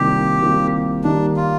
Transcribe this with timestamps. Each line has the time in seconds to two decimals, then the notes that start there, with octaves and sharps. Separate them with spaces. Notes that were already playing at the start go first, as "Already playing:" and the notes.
Already playing: C2 C3 D#3 A#3 F4 G4
0.42 C2 C3 D#3 A#3 F4
1.04 D#3 G3 A#3 D4 D#4
1.36 F4